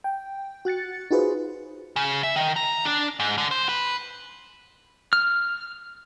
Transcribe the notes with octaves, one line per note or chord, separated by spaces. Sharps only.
G5
F#4 F#6 A6 C#7
D#4 F4 F#4 G#4 B4 C5
C#3
E5
D#3
A#5
D4
G#2
D3
C5
B4
F6